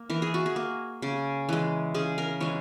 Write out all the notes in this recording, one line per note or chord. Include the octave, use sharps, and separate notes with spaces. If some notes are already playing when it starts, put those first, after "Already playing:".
Already playing: A#3
E3 A#4
G#4
F#4
G#4
A#3
C#3
E3 G#3
C#3 G#4
A#4
E3 G#3 C#5